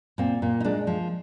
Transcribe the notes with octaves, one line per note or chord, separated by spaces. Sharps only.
A#2 C4
A#2
D#4
G#3 D4
F3